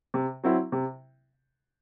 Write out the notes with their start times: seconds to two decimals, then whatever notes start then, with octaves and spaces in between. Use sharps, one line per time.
0.14 C3
0.44 F#3 C4 E4
0.72 C3